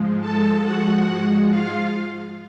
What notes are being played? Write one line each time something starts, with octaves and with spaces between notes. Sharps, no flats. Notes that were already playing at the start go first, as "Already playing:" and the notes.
Already playing: G#2 F3 G#3
A4 A5
F#4 F#5
F4 F5